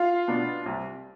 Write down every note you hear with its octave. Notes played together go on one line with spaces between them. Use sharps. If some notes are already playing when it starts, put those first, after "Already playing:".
Already playing: F4 F5
B2 B3 D4
C2